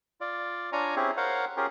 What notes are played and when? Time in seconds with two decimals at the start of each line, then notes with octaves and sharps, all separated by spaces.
0.21 F4 D5
0.73 D4 F4 C#5 G#5 A#5
0.96 C4 C#4 E4 G4 G#4
1.17 A#4 C5 C#5 F5 F#5
1.57 C#4 F4 G4 G#4 A#4